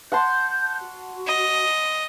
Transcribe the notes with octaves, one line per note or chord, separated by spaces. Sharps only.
F#5 A5 C6 G6
F#4
D#5